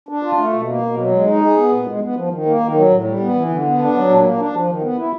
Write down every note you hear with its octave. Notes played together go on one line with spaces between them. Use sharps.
D4
F4
A3
B2
A#3
B2
F#3
G#3
D#4
G#4
B3
A#2
G#3
B3
F3
D#3
A#3
D#3
F#3
A2
G3
B3
E3
D3
B3
D4
F#3
A#2
A#3
D4
F3
D#3
B3
E4